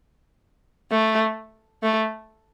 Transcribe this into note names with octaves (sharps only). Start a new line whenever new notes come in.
A3
A3